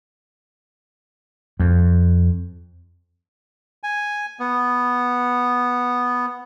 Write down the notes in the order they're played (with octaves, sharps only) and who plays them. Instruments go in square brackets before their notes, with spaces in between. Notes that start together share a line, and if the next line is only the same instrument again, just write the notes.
[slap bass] F2
[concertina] G#5
B3